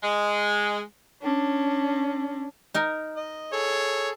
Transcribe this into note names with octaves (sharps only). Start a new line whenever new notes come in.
G#3
C#4 D4
D#4 A#4
D#5
G#4 A4 C#5